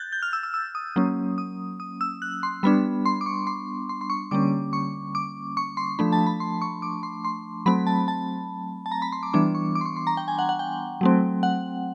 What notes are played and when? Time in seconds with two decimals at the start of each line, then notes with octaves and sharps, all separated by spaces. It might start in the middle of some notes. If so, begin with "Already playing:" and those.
Already playing: F#6 G6 A6
0.12 G6
0.22 F6
0.33 E6
0.43 E6
0.54 E6
0.75 D#6
0.96 F#3 A#3 C#4
1.38 D#6
1.80 D#6
2.01 E6
2.22 F#6
2.43 C6
2.63 G3 B3 D4 B5
3.06 C6
3.21 D6
3.26 C#6
3.47 C6
3.89 C6
4.01 C6
4.10 C#6
4.31 D3 G3 A#3 C#4 D6
4.73 C#6
5.15 D6
5.57 C#6
5.77 C6
5.99 F3 A3 D4 B5
6.12 A5
6.26 B5
6.40 C6
6.62 C#6
6.82 D6
7.03 C6
7.24 C6
7.66 F#3 A3 C4 B5
7.87 A5
8.08 A5
8.86 A5
8.92 A#5
9.02 B5
9.12 C6
9.23 D6
9.33 E3 G3 B3 D4 D6
9.55 C#6
9.75 D6
9.81 C6
9.86 C#6
9.96 C6
10.07 A#5
10.17 G5
10.28 G#5
10.39 F#5
10.49 F#5
10.59 G5
11.01 F#3 A3 C4
11.43 F#5